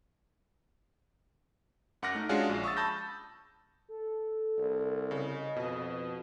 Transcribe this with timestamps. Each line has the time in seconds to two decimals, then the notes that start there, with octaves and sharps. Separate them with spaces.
2.02 F#2 F#5 D6 F6 A#6
2.15 A3 D#4
2.29 G#3 C#4 D4 F4 F#4 G#4
2.49 A#1
2.64 C#6 D#6 E6 A6
2.77 A5 B5 E6 G6 A#6
3.89 A4
4.58 C2
5.11 C#3 D#5
5.56 F2 B2 D#6